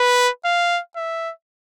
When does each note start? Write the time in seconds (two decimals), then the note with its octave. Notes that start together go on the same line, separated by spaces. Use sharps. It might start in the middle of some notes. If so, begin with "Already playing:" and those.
Already playing: B4
0.45 F5
0.96 E5